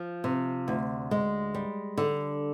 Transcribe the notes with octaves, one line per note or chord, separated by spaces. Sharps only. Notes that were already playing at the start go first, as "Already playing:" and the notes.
Already playing: F3
C3
D2
G#3
G3
D3